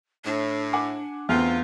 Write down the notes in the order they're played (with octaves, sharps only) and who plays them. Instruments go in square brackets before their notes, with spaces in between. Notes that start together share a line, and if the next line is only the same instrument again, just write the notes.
[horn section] A2 [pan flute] D4
[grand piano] F#5 G#5 D6
[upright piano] E2 [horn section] D3 A3 F4 [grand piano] C4 F6